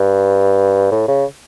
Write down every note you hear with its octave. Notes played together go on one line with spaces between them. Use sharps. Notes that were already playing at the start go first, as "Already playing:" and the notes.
Already playing: G2
A2
C#3